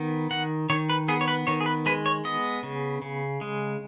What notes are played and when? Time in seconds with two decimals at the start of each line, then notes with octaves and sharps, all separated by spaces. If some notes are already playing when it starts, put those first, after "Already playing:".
Already playing: D#3 B3
0.31 D#3 F#5
0.70 D#3 C#5
0.90 B4
1.08 B3 G#4
1.21 C#5
1.28 B4
1.47 D#3 C#5
1.60 G#4
1.66 B4
1.86 G#3 B4
2.06 C#5
2.24 B3 D#5
2.63 C#3
3.02 C#3
3.41 G#3